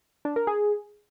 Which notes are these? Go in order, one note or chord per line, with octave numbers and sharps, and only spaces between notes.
D4
A#4
G#4